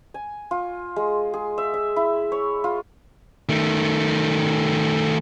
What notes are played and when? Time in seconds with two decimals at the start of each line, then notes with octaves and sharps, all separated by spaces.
0.14 G#5
0.51 F4
0.96 G#3
1.34 G#4
1.58 E5
1.74 E5
1.96 E4
2.32 C#5
2.64 F4
3.49 D#3 A3